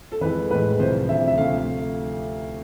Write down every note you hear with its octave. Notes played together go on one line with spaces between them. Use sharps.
A4
F2 E3 G#3 B4
A2 E3 G#3 B4
C2 C3 F3 C5
D2 C3 F3 E5
E5
D2 C3 F3 A3 F5